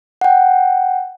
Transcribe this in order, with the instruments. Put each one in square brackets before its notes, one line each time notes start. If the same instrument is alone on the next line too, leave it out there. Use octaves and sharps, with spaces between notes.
[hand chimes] F#5 G5